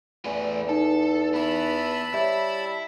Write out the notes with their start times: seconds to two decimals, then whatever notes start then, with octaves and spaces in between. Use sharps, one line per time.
0.26 E2 A3 B4 D5 G#5
0.69 D#4 A4
1.34 B3 E4 A5 B5 E6
2.14 G3 E4 C#5 E5